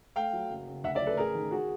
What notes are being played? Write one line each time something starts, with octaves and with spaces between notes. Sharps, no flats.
A3 F5 G5
F#3
F#1
C#3
D2 E5 F#5
D5 E5
F#3
A4 B4
A1 G#4 A#4
D#3
F#4 G#4